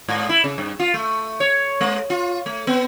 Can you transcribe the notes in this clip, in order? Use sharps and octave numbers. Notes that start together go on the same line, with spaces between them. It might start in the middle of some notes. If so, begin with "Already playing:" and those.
G#2
E4
C#3
G2
F4
A3
C#5
G#3
F4
A3
B3